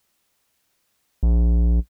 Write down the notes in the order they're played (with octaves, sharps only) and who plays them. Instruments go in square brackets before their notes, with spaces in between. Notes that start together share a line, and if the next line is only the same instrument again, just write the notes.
[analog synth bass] A#1